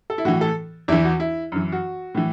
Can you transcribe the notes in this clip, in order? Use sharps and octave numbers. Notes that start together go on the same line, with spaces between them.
A4
E4
A2 E3 F#4
A4
E2 E3 E4
F#4
E4
F#2 E3
F#4
A2 E3